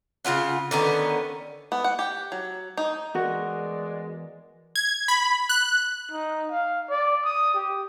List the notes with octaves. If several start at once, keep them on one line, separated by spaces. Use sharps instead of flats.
C#3 B3 F4 F#5
D3 D#3 B3 C#4
B3
F#5
G4
F#3
D#4
E2 G#3 F#4 A#4 D5
G#6
B5
F#6
D#4
F5
D5
D#6
G4